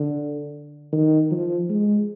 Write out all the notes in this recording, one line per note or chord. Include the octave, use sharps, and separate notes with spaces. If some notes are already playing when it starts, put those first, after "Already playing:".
Already playing: D3
D#3
F3
G#3